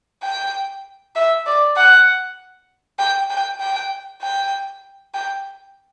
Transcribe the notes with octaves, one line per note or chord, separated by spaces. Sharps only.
G5
E5
D5
F#5
G5
G5
G5
G5
G5